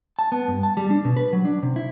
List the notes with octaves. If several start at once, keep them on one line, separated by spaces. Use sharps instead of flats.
A5
B3
G2
A5
G3
D4
B2
B4
F#3
D4
C3
E4